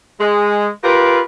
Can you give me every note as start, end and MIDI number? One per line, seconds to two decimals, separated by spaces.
0.20 0.68 56
0.84 1.21 65
0.84 1.21 67
0.84 1.21 70
0.84 1.21 71